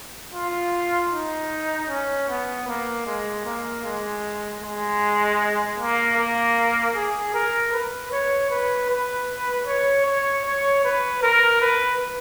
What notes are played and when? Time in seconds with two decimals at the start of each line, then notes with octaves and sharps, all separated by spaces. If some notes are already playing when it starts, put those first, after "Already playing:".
0.34 F4
1.12 D#4
1.89 C#4
2.29 B3
2.68 A#3
3.06 G#3
3.45 A#3
3.84 G#3
4.62 G#3
5.78 A#3
6.17 A#3
6.95 G#4
7.34 A#4
7.73 B4
8.12 C#5
8.50 B4
8.90 B4
9.67 C#5
10.06 C#5
10.45 C#5
10.84 B4
11.23 A#4
11.62 B4